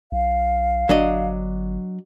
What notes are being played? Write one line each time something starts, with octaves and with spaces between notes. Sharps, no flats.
B1 F5
G1 F#3 D4 D#5